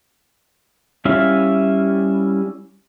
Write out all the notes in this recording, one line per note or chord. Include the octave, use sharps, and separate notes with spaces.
G3 C#4 E4 E5 F5